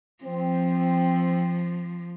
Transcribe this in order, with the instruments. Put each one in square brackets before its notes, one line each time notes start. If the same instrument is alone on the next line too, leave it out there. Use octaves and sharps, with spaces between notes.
[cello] F3 [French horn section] C4